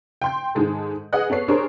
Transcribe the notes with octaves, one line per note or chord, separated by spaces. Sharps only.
G5 C6 G6
G#2 D#3 G#3 A4
G#4 B4 D#5 F#5 F#6
B3 A4 C#5 C7
D4 G4 G#4 A#4 C5 C#5